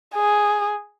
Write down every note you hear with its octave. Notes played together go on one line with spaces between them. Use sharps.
G#4